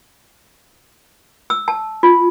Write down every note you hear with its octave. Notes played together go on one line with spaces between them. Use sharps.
E6
A5
F4